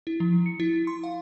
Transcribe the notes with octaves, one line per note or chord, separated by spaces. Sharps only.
E4
F3
C#7
E4
C6
F5